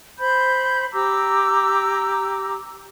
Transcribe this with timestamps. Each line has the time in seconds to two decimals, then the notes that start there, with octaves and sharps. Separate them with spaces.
0.19 C5 B5 G6
0.93 G4 A#5 D6 E6